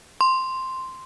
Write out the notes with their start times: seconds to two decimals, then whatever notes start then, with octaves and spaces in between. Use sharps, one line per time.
0.21 C6